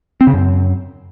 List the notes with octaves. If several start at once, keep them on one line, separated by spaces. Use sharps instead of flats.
C4
C#3
F#2